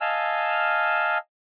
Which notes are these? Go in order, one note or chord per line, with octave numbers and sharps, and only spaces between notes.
D#5 F5 G#5 A5 E6 F6